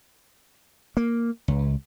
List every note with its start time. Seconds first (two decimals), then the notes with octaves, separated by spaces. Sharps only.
0.97 A#3
1.48 C#2